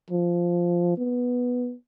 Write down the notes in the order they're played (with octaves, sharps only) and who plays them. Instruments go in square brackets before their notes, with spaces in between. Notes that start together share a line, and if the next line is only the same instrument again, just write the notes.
[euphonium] F3
B3